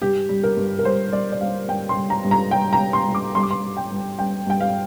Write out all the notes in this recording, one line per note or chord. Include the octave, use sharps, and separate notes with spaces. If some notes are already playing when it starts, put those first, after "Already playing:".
G2 G4
G3
A#4
G2
A#4
G3 C5
G2 D5
D5
G3 F5
G2 G5
C6
G3
A#5
G2
A#5
G3 G5
A#5
G2
C6
G3
D6
G2 C6
D6
C6
G3
G5
G2
G3 G5
G2 G5
F5